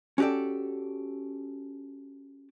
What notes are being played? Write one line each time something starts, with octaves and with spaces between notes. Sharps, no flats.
C#4 F#4 G4 A4 D5